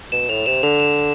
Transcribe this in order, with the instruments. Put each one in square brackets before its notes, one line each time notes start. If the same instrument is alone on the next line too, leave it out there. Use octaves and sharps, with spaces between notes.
[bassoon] B2 [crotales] E7
[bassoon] A2 [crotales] F7
[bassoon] C3 [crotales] E7
[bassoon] D3 [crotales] F7
[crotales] E7